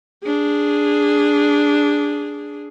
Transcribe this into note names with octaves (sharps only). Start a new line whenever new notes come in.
D4 G#4